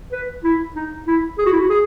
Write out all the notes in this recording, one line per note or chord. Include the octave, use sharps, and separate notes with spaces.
B4
E4
D#4
E4
G#4
F#4
E4
F#4
G#4